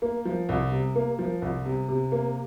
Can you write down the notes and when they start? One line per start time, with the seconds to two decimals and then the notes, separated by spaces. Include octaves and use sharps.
0.02 A#3
0.25 F3
0.49 C2
0.72 C3
0.95 A#3
1.19 F3
1.42 C2
1.66 C3
1.88 C3
2.12 A#3